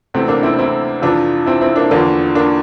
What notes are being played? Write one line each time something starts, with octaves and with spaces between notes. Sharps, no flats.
D2 C3 E3 A3 C4
A#3 D4
C4 E4
C4 E4
F2 C3 E3 D4 F4
C4 E4
C4 E4
A#3 D4
E2 D3 F3 A#3 D4
A#3 D4